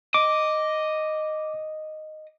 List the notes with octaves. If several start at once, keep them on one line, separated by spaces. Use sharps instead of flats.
D#5 D6